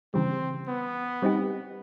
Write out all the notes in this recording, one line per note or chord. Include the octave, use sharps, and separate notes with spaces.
C#3 E3 G3 C4
B3
G3 C4 D#4 G4